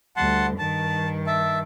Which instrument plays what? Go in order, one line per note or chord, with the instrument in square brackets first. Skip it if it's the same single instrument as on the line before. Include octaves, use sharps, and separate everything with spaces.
[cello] D2 G3 [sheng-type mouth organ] F#5 A5 C6
[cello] G2 D#3 [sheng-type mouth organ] A5
[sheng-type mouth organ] E5 A5